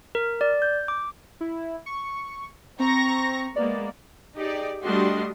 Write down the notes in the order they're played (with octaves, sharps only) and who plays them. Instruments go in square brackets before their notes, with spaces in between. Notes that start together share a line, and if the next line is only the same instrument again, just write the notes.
[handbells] A#4
D5
G6
D6
[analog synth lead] E4
C#6
[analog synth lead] C4 [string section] A#5 C#6 A#6
[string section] G#3 A#3 B3 [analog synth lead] D5
[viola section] D#4 G4 G#4 D5
G3 A3 D4 F#4 D#5 C6